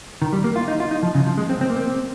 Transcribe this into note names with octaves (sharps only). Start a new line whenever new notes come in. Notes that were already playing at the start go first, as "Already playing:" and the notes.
D#3
G3
A#3
F4
D#4
F4
D#4
F3
C#3
F3
G#3
C4
C4
A#3
C4